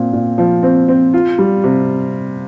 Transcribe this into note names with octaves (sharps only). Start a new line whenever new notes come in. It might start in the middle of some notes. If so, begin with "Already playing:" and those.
Already playing: A#2 C4
A#2
F3
C4
C4
F4
G3
C3